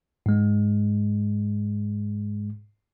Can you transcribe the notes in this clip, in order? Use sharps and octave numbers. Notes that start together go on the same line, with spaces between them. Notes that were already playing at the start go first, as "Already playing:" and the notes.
G#2 G#3